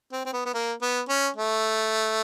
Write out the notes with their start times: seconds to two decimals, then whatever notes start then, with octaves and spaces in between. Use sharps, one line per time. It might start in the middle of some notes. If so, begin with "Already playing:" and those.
0.12 C4
0.26 C4
0.33 B3
0.46 B3
0.54 A#3
0.82 B3
1.09 C#4
1.37 A3